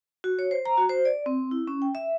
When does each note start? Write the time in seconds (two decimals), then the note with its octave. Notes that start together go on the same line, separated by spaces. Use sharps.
0.24 F#4
0.39 C#5
0.51 C5
0.65 A#5
0.78 F#4
0.89 C5
1.05 D5
1.26 C4
1.51 E4
1.67 C#4
1.82 G5
1.95 E5